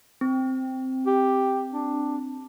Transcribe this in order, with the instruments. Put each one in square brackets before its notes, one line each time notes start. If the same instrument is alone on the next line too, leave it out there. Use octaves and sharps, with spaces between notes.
[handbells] C4
[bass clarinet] G4
D4